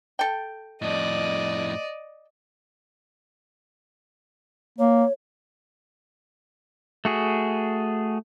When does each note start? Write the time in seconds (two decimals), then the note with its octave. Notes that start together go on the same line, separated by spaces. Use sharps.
0.19 A4 G5
0.82 F2 A2 D5 D#5
4.79 A#3 C#5
7.05 A3 F#4 G#4